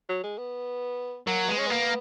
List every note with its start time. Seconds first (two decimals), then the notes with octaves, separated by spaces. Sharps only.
0.09 F#3
0.23 G#3
0.38 B3
1.26 F#3 A#3
1.48 G#3 B3
1.58 C#4
1.67 A#3 B3